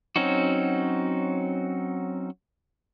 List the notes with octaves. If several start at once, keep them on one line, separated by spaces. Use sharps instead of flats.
F#3 C4 C#4 D#4 F#4